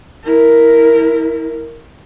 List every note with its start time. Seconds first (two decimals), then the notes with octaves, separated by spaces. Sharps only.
0.24 E4 A#4